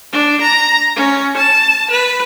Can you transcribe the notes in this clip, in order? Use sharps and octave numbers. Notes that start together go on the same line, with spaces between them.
D4
A#5
C#4
A5
B4